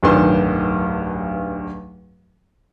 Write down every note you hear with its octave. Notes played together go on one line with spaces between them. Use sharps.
D1 B1 G2 D#3 B3 C6